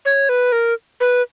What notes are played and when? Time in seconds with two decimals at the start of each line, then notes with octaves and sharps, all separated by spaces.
0.05 C#5
0.29 B4
0.52 A#4
1.00 B4